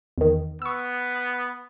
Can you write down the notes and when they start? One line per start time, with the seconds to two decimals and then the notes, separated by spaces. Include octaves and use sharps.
0.18 E2 D#3
0.62 B3 C#6 E6